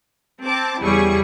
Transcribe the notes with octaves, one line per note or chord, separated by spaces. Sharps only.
C4 A5 D6
E2 C#3 G3 E4 G#4 C#6